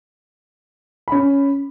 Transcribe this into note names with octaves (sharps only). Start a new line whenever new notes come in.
C#4 B5